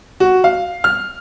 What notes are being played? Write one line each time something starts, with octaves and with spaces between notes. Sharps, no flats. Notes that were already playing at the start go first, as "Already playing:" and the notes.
F#4
F5
F6